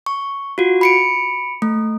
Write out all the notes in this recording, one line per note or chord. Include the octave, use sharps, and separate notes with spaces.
C#6
F4 F#4
B5 C#7 D7
A3